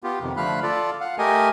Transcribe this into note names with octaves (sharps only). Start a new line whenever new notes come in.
B3 F4 G4
F2 C3 D#3
D3 F3 A3 F5 B5 F#6
F4 A4 D5
F5 F#5
A3 G4 A#4 D#5 G#5